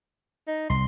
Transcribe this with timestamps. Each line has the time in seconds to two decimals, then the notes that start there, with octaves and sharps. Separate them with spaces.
0.48 D#4
0.70 C2 C6